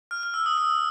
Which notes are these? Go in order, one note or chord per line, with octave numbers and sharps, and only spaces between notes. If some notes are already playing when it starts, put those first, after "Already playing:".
F6
F6
E6
D#6
E6